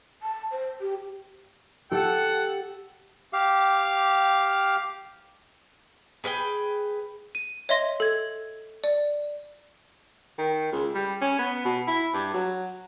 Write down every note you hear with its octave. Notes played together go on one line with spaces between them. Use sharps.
A5
C5
G4
G4 A4 F#5
G4 F5
G#4 B4 F5 G5
D#7
C#5 D#5 E5 C6 A#6
A4 G#6
D5
D#3
C#2
G3
C#4
B3
B2
E4
G2
F#3